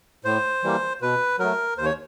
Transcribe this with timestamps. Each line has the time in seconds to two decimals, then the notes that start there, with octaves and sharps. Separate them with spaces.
0.25 A2 C5
0.63 E3 G3 A#3
1.02 B2 B4
1.39 F#3 A3 A#4
1.77 D#2 C5
1.85 C#5